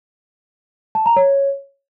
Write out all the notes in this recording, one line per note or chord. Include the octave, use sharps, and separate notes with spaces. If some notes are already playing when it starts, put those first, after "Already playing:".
A5
A#5
C#5